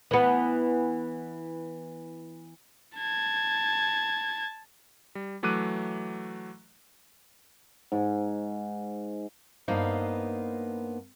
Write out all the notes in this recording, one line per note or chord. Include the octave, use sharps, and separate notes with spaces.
E3 B3
A5 G#6
G3
E3 F#3 A3 D6 F#6 D#7
G#2
G2 A#3 B3 D#4 C5